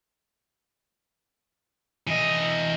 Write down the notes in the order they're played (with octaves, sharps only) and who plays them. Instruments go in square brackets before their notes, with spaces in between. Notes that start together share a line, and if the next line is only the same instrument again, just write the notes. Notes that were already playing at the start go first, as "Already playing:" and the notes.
[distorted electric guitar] E3 D#5